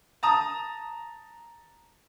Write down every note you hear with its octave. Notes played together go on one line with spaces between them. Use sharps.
A5 A#5 D#6